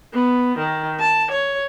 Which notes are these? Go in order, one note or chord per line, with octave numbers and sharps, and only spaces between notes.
B3
D#3
A5
C#5